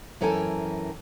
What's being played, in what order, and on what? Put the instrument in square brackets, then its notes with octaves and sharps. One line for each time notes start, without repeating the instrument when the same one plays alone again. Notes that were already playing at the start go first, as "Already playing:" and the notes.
[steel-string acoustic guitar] F#2 E3 A4 A#4 G5 G#5